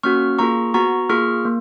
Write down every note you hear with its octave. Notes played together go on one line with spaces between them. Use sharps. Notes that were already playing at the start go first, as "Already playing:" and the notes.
A#3 C#4 F#4 C#6 F6
A#3 F4 G#4 A#5 C#6
B3 F#4 A#5 C#6
A#3 F4 G#4 C#6 F6
A#3